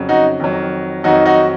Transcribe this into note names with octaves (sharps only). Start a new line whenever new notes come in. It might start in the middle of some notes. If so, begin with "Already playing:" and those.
Already playing: F2 C#3 F#3
D#4 F#4
F2 D#3 F#3
F2 D#3 F#3 D#4 F#4
D#4 F#4